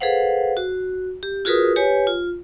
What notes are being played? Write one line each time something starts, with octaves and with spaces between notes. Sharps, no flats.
G#4 A4 B4 C5 F5 F#5
F#4
G4
F4 F#4 G#4 A#4 B4 D#6
G4 B4 C#5 G#5
F4